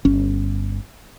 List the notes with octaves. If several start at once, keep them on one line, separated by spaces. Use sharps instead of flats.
G1 C#4